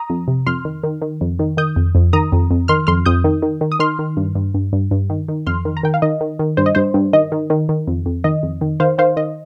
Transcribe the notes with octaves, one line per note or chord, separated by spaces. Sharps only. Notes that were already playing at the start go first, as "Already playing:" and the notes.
Already playing: A#5 D#6
F2
C3
F2 C6 F6
D#3
D#3
D#3
F2
D#3
D#3 D#6 G6
F2
F2
D#3 A#5 D#6
F2
F2
D#3 C6 F6
F2 C6 F6
F2 D#6 G6
D#3
D#3
D#3
D#6
D#3 C6 F6
D#3
G2
G2
G2
G2
G2
D#3
D#3
F2 C6 F6
D#3
A#5
D#3 G5
F5
D#3 D#5
D#3
D#3
G2 C5
D#5
G2 C5
G2
D#3 D#5
D#3
D#3
D#3
F2
F2
D#3 D#5
F2
D#3
D#3 C5 F5
D#3 C5 F5
D#3 D#5